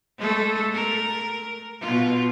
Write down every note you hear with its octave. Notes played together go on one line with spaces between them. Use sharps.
G#3 A3 A4
A#4
B2 F4